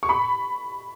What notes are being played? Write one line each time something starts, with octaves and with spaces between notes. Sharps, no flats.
C#6
B5